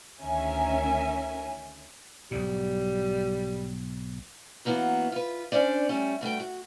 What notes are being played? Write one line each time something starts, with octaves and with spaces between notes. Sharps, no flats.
D2 D#3 C#4 A#4 E5 G#5
B1 G#2 G3
F#2 E3 A#3 B3 F#4
F4 B4
C#4 D4 C5 D5
G3 A3 C#4
G2 A3 F#4 G5
F#4